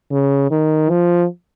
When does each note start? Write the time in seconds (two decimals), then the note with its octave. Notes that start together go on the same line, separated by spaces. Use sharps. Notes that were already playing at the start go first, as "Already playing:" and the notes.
0.11 C#3
0.51 D#3
0.89 F3